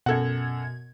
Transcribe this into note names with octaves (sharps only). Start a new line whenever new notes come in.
F#2 B2 A4 F#5 G#6